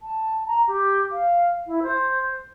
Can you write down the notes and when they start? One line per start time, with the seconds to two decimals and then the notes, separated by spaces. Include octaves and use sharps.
0.02 A5
0.47 A#5
0.67 G4
1.12 F5
1.67 E4
1.83 C5